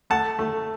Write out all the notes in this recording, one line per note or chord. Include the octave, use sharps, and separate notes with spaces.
A3 F#5 A5
A3